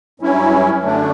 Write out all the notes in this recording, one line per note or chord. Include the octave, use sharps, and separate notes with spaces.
G2 F#3 C#4 E4
F#2 D3 A3 D4